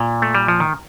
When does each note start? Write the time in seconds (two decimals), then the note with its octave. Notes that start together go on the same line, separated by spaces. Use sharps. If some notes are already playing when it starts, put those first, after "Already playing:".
Already playing: A#2
0.22 A3
0.35 G3
0.48 F3
0.60 D#3